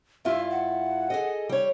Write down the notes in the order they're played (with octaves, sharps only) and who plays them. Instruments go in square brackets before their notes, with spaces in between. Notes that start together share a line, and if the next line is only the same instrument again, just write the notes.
[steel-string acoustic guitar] G2 E4 F4 [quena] E5
[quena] F#5
[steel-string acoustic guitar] G#4 A4 D#5
G3 C#5